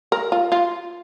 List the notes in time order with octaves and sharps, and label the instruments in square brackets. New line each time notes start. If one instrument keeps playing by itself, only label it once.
[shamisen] A#4
F4
F4